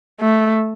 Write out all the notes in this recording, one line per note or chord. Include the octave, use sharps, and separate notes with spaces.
A3